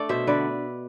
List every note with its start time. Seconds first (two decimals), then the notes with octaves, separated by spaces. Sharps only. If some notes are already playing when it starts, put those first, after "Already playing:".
Already playing: A3 D4 A4 D5
0.09 B2 C5 E5
0.27 D3 B4 D5